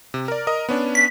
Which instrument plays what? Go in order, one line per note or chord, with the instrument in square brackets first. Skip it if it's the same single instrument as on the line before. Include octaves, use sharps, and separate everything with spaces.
[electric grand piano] C3
A#4 D5
A#4 D#5 D#6
B3 C#4 D4
[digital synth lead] B6